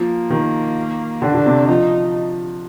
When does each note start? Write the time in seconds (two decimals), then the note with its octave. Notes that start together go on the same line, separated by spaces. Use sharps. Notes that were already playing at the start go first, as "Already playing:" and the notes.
Already playing: F3 A#3
0.30 D#3
1.22 D3 D4
1.34 D3
1.46 C3
1.68 F3 D#4